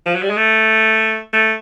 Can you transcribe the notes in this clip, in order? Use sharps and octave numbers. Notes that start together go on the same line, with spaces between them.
F3
F#3
G3
G#3
A3
A3